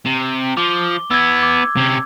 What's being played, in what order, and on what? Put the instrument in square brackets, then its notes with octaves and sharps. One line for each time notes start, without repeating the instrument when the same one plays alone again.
[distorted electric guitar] C3
[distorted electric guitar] F3 [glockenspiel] D6 G7
[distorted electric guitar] B3 E4 [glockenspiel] E6 G#6
[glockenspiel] D6
[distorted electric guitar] C3 C#4